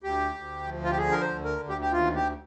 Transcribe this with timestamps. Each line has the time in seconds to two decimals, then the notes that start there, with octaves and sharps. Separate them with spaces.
0.03 D2 G4
0.35 D2
0.67 F3
0.84 F4
0.91 G4
0.98 D3 G#4
1.12 A#4
1.21 C5
1.29 D2
1.45 A#4
1.61 D2
1.69 G4
1.81 G4
1.92 D#2 F4
2.15 G4